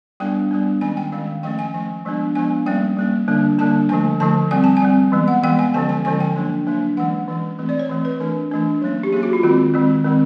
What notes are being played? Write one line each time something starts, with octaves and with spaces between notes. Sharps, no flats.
G3 B3 D4 G5
G3 B3 D4
D#3 G#3 C#4 G#5
G5
D#3 G#3 C#4 F5
F3 A3 C#4 G5
G#5
F3 A3 C#4 G#5
F3 G#3 B3 D4
F3 G#3 B3 D4 G#5
G3 A#3 C#4 G5
G3 A#3 C#4
D3 G3 A#3 D4
D3 G3 A#3 D4 A5
D3 F3 A3 G#5
D3 F3 A3 A5
G3 C4 G#5
A5
G#5
G3 C4
E3 G#3 B3
F#5
E3 G#3 B3 G5
G#5
D3 F3 G#3 C#4 A5
G#5
D3 F3 G#3 C#4 G#5
G5
F#3 A#3 D4
F#3 A#3 D4
E3 G#3 C#4 F#5
E3 G#3 C#4
E3 A3 C4
D5
C#5
E3 A3 C4
B4
E3 A3 D4 A#4
E3 A3 D4
F#3 A#3 C#4
G4
F#3 A#3 C#4 G#4
F#4
F4
D#3 G#3 C4 F#4
D#3 G#3 C4
D#3 G#3 C4